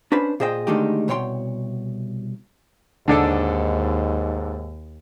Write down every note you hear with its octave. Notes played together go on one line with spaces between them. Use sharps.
C#4 D4 B4 C5 B5
A#2 G#4 C5 D#5 G5
D3 D#3 G#3 A3 D#4 G4
C2 B2 C#5 G5 C6
D#2 G#2 D3 D4 A4